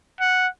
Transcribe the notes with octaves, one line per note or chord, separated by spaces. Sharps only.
F#5